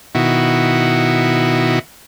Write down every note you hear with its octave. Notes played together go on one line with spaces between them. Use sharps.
B2 D#3 E4 F#4